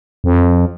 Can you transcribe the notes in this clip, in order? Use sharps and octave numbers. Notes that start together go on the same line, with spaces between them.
F2